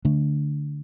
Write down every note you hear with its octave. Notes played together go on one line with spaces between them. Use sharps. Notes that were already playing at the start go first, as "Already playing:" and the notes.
D3 A3 D4